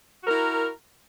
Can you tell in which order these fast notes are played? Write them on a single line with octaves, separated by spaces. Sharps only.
F#4 A#4 E4